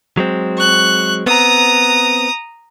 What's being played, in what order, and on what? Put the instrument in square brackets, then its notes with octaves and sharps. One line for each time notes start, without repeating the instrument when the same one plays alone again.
[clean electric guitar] F#3 G#3 C4
[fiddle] C#6 F#6
[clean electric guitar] B3 C4 [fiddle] A#5 D#6